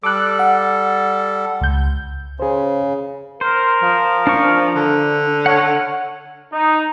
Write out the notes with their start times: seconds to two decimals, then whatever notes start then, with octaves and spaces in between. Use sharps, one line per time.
0.03 G3 A4 D6 F#6
0.39 F#5
1.61 C#2 G6
2.40 C#3 G#4 C5
3.41 A#4 C5
3.82 F3
4.27 D4 C5 C#6
4.75 D3
5.46 C#5 F#5 F6
6.53 D#4